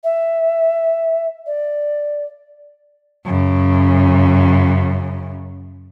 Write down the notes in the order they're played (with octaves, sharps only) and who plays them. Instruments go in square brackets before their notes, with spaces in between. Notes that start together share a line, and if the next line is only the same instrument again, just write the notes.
[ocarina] E5
D5
[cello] F#2 C#3